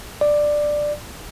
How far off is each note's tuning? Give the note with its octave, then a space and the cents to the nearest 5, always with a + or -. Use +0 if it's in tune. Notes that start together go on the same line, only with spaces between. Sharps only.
D5 +10